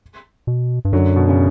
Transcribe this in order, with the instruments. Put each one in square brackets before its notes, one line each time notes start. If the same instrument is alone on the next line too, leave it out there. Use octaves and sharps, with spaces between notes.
[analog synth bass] B2
G2
[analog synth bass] F#2 [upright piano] D3 F#3
[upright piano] B2
C#3